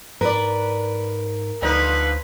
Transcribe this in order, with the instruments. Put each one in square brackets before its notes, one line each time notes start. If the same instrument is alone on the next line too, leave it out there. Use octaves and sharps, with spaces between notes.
[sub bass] G#2 [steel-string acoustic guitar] A#4 [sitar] B4 D5
[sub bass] D2 [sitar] D3 F3 D#4 [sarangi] B4